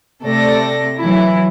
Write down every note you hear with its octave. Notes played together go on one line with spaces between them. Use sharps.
C3 A3 A4 D5 A#6
E3 F#3 E4